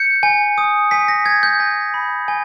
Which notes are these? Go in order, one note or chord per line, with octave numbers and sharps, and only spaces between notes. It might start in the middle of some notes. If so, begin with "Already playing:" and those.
Already playing: G6 C#7
G#5
D#6
G#5 B6
A#6
G6 G#6
G6
G#5 A#6
B5
G#5